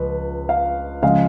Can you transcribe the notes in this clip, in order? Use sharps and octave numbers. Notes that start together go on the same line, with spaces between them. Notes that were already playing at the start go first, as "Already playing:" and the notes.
Already playing: C#2 F3 B4
F5
C#3 F3 G#3 F5